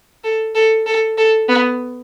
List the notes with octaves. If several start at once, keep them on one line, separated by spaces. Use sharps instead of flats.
A4
A4
A4
A4
B3